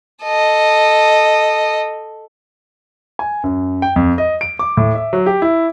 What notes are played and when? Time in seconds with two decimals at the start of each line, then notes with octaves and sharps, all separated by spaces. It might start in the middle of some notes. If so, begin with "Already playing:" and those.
0.23 A4 D#5
3.19 G#5
3.44 F#2
3.82 G5
3.96 F2
4.18 D#5
4.41 D7
4.59 D6
4.77 A2
4.95 E5
5.13 F#3
5.26 G4
5.42 E4